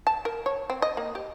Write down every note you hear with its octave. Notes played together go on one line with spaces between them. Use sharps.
A5
A#4
C#5
C4
D#5
A#3
G4